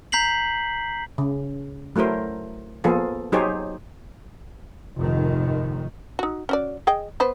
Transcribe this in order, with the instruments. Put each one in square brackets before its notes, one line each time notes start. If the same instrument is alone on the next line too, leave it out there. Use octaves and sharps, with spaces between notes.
[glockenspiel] A#5 G6 B6 C7 F#7
[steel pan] C#3
F#3 A3 E4 A#4 C5
F3 A#3 B3 F4 G#4 A4
F#3 D#4 G4 G#4 C5 C#5
[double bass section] F1 G#2 D#3
[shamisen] D#4 F#4
C#4 F#4 D5
G#4 D#5 G5
B3 B4 C5